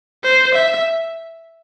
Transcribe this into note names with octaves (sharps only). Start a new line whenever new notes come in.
C5
E5